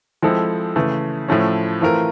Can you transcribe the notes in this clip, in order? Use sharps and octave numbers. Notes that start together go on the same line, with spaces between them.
F3 G#3 C4 E4 A4
C#3 E3 A3
A2 F3 A3 C#4
E3 A3 C4 F4 A#4